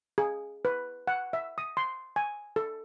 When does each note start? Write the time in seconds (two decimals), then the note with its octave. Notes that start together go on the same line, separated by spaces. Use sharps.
0.18 G#4
0.65 B4
1.07 F#5
1.33 E5
1.58 D#6
1.77 C6
2.16 G#5
2.56 A4